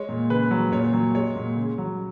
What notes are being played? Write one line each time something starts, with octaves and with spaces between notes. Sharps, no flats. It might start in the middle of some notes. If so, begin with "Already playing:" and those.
Already playing: G#3 C#5
A#2
C#3 B4
F#3
A#2 C#5
F#3
G#3 C#5
A#2
C#3
F#3